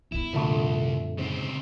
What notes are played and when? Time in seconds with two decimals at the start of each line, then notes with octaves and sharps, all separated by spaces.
0.12 F#2 B3 E4
0.33 C2 F2 A#2 D3 A3
1.18 G#2 C#3 C4